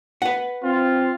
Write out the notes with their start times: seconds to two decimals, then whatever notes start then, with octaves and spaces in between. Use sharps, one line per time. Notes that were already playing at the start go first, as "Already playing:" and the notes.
0.22 B4 F#5
0.64 C4 F4